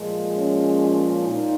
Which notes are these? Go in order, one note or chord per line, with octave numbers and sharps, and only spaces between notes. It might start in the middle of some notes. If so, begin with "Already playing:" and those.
Already playing: A#2 F3 G#3
C#4
A#2 D#4